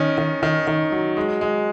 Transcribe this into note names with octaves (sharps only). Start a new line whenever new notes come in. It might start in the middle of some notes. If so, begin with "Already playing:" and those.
Already playing: D#3 C#4
D#3
D#3
D#3
F#3
G#3
G#3